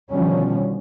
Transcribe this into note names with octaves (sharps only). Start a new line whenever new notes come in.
B2 D3 D#3 F3 G3 C#4